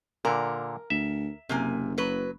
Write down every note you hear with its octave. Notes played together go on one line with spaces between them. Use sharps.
A#2 D3 A#4
D2 E5
F#1 C3 A#3 G#5
F#3 B4